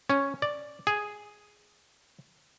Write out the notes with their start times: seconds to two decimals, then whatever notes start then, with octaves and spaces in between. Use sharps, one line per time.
0.10 C#4
0.42 D5
0.87 G#4